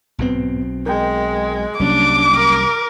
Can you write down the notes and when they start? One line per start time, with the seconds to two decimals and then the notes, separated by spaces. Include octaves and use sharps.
0.19 B1 G#2 B2 B3 C4
0.86 G#3 A#4 G5
1.80 C2 F#3 G3 A#3 C#4 D4 D6
2.34 A#4